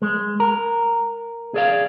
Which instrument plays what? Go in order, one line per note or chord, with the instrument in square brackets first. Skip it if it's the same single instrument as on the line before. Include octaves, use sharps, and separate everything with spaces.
[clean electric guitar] G#3
A#4
G#4 D5 F5